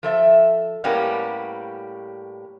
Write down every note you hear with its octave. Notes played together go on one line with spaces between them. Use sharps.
F3 A4 E5
A2 G3 A#3 B3 C#4 G4